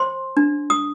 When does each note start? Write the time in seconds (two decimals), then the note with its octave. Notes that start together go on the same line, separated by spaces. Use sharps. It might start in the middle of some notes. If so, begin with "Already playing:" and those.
Already playing: C5 C6
0.37 D4
0.70 D#6